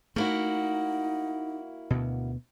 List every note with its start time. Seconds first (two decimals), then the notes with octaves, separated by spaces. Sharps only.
0.16 A3 A#3 D#4 E4 F#4
1.90 D2 B2